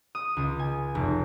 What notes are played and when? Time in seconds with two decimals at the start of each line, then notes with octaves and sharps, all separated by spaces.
0.15 D#6
0.37 C#2
0.59 G#5
0.95 F1